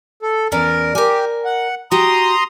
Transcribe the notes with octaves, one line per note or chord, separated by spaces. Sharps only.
A4
E2 C#4 A#4 D5
G4 A#4 G#5
F#5
F#4 G4 A#5 C6 D#6